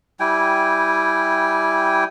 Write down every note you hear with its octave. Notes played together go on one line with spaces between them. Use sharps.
G3 E4 G5 G#5